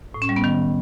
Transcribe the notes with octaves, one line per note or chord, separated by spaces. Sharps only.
A2
C#4
G3
B3
D#3